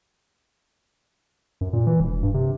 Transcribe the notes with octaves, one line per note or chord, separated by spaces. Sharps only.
F#2
A#2
E3
E1
G2
C3